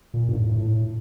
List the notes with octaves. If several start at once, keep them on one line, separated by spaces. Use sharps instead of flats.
A#2
G2
A2
A2